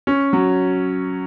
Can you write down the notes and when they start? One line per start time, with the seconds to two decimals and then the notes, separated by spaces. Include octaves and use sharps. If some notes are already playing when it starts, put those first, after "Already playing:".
0.07 C#4
0.33 F#3